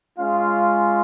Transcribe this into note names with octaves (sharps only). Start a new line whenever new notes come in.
G#3 C#4 F4 F5